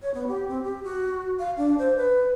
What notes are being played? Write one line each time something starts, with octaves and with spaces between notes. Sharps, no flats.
C#5
B3
G4
C4
G4
F#4
F5
D4
C5
B4